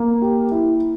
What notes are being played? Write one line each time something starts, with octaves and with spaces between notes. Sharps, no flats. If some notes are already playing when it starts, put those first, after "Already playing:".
Already playing: A#3
G4
E4